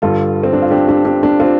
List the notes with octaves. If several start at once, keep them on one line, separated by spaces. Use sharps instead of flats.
G2 D3 G3 F4 A4
C4
D4
F4
D4 G4
D4 G4
D4 G4
D4
C4 F4